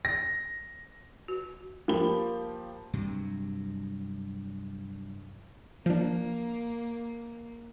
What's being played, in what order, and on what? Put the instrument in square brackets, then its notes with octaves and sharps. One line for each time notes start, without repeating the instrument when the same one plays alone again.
[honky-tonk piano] A#6
[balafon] F#4
[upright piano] F3 A#3 G4 B5 G7
[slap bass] G2 C3 F#3
[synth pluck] F3 D4 [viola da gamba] A#3